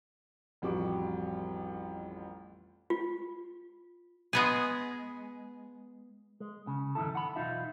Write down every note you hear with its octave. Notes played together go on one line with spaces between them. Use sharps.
A1 F2 G3 F#4 D6
F4
G#3 B3 G#4
G#3
C#3
F2 G#2 D#3 E4 A4
F#5 B5
B1 E2 D#4 F4 E5